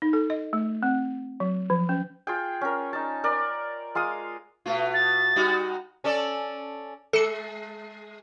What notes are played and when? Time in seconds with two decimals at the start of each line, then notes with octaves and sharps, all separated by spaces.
0.02 D#4
0.13 A4
0.30 D#5
0.53 A3
0.83 C4
1.40 F#3
1.70 F3
1.89 C#4
2.27 F4 G#4 G5
2.61 C#4 A#4
2.93 D#4 A5
3.24 A#4 D5
3.95 G#3 F4 F5 D#6
4.66 B2 A3 F4
4.94 A6
5.36 G3 D#4 F#4
6.04 C#4 A4 D5
7.13 G#3 A4 C#7